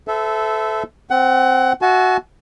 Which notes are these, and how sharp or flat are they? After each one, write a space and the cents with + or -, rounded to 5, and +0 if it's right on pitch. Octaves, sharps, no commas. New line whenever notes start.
A4 -15 C5 -45 E5 +0
C4 +0 F#5 +25
F#4 +0 E5 +0 A5 -45